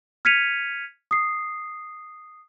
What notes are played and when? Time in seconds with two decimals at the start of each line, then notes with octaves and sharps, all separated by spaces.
0.25 F6 G#6 B6 C#7 D#7 F7
1.11 D#6 C7